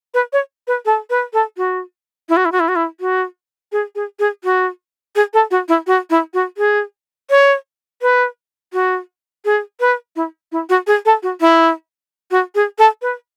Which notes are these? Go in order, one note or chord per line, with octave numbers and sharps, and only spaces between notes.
B4
C#5
B4
A4
B4
A4
F#4
E4
F#4
E4
F#4
E4
F#4
E4
F#4
G#4
G#4
G#4
F#4
G#4
A4
F#4
E4
F#4
E4
F#4
G#4
C#5
B4
F#4
G#4
B4
E4
E4
F#4
G#4
A4
F#4
E4
F#4
G#4
A4
B4